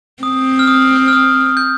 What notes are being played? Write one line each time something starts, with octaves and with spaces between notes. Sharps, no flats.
C4 D#6
F6
D#6
F6
D#6
G6